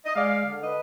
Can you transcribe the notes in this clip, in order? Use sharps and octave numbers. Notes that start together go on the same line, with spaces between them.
D#5
G#3 D5 F5
D3
B4 D#5